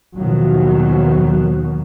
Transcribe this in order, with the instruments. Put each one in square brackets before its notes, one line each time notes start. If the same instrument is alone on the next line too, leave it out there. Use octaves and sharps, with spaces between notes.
[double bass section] D#2 B2 D#3 F3 F#3